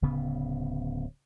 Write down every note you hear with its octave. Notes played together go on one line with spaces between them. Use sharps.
D1 C#3 B3